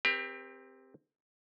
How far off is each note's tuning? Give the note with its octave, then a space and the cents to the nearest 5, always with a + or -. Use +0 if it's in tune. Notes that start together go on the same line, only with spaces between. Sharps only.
C4 +0 G4 +25 A#4 +45